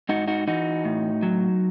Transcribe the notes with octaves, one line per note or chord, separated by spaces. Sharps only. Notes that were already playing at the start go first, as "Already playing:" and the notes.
G#2 D#4 F#4
D#4 F#4
E3 D#4 F#4
A2
F#3